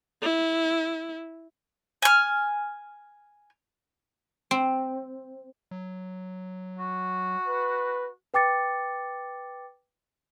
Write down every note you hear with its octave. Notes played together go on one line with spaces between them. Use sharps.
E4
G#5 F6
C4
F#3
F#4
B4
B4 G5 D6 A6 C#7